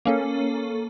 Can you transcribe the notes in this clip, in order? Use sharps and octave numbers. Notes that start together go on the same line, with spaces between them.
A#3 C#4 A4